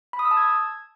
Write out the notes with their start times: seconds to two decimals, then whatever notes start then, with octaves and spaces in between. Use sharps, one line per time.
0.13 B5
0.19 D#6
0.25 E6
0.31 A5
0.37 G#6